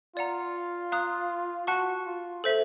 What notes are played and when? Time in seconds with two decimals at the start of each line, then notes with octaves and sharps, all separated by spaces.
0.16 F4 D5 F#5 A#5
0.92 F5 A#5 D#6 F#6
1.67 F#4 F#5 A5 C#6 F#6
2.05 F4
2.44 A4 C5 E5